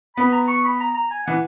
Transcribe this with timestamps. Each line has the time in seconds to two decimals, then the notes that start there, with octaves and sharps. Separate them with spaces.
0.16 B3 B5
0.32 A#5
0.48 C#6
0.64 B5
0.80 A#5
0.94 A#5
1.10 G#5
1.26 E3 F#5